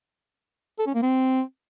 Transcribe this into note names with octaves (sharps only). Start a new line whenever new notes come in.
A4
C#4
A#3
C4